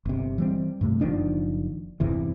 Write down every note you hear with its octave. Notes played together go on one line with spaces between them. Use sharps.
G1 C3
E3 G3 C4
G2 C3 A3
F#1 D#3 F3 D4
G1 E2 C3 E3